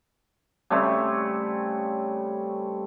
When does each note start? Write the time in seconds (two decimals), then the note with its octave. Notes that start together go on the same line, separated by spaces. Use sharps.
0.70 C#3 G3 A3 C4